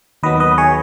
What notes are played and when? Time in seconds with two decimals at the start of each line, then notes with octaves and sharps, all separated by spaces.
0.23 D#2 D#3 F#3 B3 B4 D#5
0.40 B4 D#5
0.58 G#4 C#5